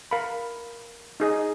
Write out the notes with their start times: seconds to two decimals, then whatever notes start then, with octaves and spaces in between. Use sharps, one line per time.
0.11 A#4 F5 B5
1.20 D#4 G#4 D#5